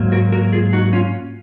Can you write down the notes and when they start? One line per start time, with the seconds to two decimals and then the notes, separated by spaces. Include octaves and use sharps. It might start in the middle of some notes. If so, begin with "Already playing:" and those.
Already playing: G#2 F#3 A#3
0.12 F#4 A#4
0.32 F#4 A#4
0.52 F4 G#4
0.73 D#4 F#4
0.93 C#4 F4